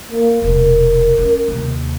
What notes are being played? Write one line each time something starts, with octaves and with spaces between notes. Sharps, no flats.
A#3
E1 C3 A#4
C#4
D#2 C3